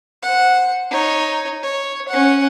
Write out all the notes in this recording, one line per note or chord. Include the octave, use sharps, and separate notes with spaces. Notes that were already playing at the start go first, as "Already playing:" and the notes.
C5 F#5
D#4 C#5
C#5
C#4 F#5